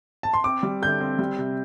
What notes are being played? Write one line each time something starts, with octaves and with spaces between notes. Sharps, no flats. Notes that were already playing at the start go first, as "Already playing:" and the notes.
A5
C6
C4 D6
G3
D3 G6
C4
G3
C3